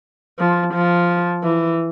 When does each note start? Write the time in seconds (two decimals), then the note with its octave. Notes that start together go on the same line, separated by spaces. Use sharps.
0.39 F3
0.73 F3
1.44 E3